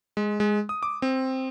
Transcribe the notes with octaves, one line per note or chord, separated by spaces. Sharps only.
G#3
G#3
D#6
D6
C4